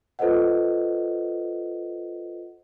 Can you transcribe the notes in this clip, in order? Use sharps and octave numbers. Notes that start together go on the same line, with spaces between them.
F4 A4 B4 C5 D#5 F#5